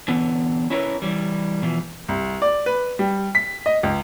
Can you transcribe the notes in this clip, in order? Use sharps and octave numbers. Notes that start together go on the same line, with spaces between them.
D3 E3 B3
C#4 E4 A#4 B4 C#5
E3 G3
B2 E3 F3
C2
D5
B4
G3
B6
D#5
C#2